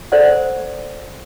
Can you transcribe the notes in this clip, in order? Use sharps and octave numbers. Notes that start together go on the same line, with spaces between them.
A4 C5 D5 F#5